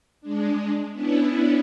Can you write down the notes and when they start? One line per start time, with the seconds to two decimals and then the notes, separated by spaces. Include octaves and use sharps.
0.21 G#3 D4
0.93 B3 C#4 D4 E4